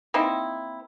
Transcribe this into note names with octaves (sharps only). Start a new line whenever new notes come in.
A#3 C4 D#4 E4